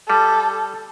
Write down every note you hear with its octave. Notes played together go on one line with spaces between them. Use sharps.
G3 A4